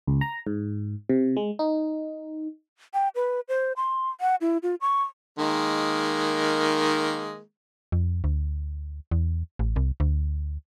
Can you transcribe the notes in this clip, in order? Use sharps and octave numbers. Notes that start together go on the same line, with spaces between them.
C#2
A#5
G#2
C3
G#3
D#4
G5
B4
C5
C6
F#5
E4
F4
C#6
D#3 G#3 A#3
F2
D2
E2
A1
C2
D2